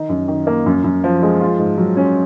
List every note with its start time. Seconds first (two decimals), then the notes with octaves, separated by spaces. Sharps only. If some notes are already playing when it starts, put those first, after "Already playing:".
Already playing: D#3 D#4
0.09 F#2
0.28 D#3
0.47 A#3
0.66 F#2
0.84 F#2
1.04 F3
1.22 G#3
1.41 F4
1.59 G#2
1.78 F#3
1.97 C#4